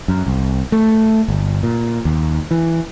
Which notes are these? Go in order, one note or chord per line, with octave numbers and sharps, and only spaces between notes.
F#2
C2
A3
G1
A#2
D#2
E3